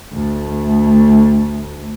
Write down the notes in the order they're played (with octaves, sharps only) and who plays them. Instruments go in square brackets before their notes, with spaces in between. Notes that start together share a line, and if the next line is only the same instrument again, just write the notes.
[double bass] D2 A3